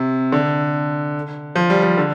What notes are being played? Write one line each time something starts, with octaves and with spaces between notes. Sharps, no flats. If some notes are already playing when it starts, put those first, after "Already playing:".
Already playing: C3
D3
F3
G3
F3
D3